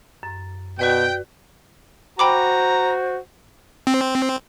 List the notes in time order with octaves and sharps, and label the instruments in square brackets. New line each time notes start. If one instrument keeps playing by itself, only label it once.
[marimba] F#2
[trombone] B2 [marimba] F#4 B4 D5 [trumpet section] G5
[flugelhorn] F#4 [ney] C5 [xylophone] G5 B5 D6 [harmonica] A#5
[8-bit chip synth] C4